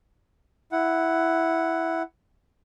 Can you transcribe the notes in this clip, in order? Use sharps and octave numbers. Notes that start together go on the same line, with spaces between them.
E4 F#5